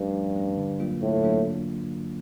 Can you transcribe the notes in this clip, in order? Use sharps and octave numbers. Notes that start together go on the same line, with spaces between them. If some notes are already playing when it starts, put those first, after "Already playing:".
Already playing: G2 F3 A3 C#4
F3
A3 C#4
D3
F#3 A#3 D4 F4
A2 D3
F#3 A#3 D4 F4